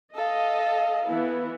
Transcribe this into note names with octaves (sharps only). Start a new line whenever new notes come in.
A4 D#5 F5
E3 B3 E4